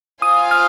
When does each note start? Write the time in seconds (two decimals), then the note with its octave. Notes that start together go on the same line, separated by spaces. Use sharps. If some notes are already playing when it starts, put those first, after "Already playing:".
0.22 F4 C5 F5 G#5 D#6
0.51 F6